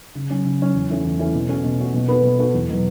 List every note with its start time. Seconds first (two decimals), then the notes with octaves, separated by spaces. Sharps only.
0.15 C#3
0.29 F#3 C#4
0.45 C#3
0.60 F#3 C#4
0.74 E2
0.90 E3 A3 C#4
1.04 E2
1.19 E3 A3 C#4
1.34 B2
1.49 A3 C#4 F#4
1.64 B2
1.79 A3 C#4 F#4
1.94 B2
2.08 B3 F#4 A4
2.23 B2
2.39 B3 F#4 A4
2.54 E2
2.69 B2 F#3 B3